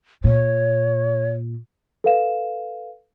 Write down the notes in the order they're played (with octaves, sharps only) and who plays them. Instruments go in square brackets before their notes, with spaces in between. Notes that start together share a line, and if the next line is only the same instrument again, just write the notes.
[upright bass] A#2 [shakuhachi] C#5
[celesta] A4 B4 F5 E7